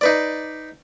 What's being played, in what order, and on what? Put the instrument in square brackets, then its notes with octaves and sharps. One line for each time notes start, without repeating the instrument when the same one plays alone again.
[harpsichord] D#4 B4 D5